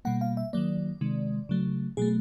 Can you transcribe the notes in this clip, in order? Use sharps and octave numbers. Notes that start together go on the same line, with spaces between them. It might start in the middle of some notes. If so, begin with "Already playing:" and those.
B2 G3 A#3 F#5
F5
E5
D#3 F#3 A#3 D5
C3 D#3 G#3
C#3 F#3 A3
B2 F#3 A3 G#4